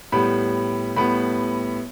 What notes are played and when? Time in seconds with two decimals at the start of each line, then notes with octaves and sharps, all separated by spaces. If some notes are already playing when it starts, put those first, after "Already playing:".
0.12 A2 G3 B3 B5
0.96 A2 G3 B3 B5